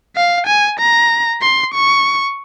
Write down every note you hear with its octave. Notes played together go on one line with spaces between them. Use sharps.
F5
G#5
A#5
C6
C#6